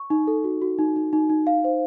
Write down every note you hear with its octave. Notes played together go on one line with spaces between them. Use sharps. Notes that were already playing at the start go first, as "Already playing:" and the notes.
Already playing: C#6
D#4
A4
F#4
F#4
D#4
D#4
D#4
D#4
F5
C5